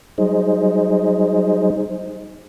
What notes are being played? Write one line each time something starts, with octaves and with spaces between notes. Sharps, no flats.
F#3 G3 D#4 G#4 C5 D#5